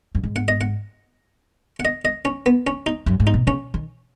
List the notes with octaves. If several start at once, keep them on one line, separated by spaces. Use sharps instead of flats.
F#2
G#2
F#5
D#5
F#5
F#5
D#5
D#5
C#4
B3
C#4
D#4
F#2
G#2
D#4
B2
C#3 C#4
D#3